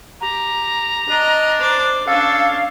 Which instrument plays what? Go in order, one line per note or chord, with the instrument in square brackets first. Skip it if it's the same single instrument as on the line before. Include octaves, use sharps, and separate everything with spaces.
[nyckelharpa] G4 [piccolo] A#5
[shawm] D4 [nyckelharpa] D#5
[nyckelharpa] C5 D5
[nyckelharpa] C#4 D4 [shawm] A4 [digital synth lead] F5